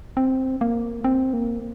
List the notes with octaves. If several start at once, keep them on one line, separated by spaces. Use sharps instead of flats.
C4
A#3
C4
A#3